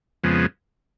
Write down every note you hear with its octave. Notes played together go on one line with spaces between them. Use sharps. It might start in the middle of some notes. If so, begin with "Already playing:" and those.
F2 C#3 F3 G#3 B3